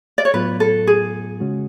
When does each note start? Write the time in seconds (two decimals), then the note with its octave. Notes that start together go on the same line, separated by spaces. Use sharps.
0.18 D5
0.25 C#5
0.34 A2 F#3 B3 F4 B4
0.60 A4
0.87 G#4
1.40 C#3 G#3 C#4 F#4